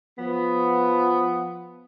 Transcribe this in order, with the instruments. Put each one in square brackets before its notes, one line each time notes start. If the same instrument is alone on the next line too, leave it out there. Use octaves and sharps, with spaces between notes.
[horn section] F3 B3